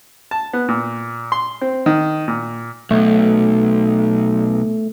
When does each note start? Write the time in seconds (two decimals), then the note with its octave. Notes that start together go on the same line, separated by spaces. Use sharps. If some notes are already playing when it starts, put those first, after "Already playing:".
0.31 A5
0.53 B3
0.68 A#2
1.32 C6
1.61 C4
1.86 D#3
2.28 A#2
2.91 B1 A3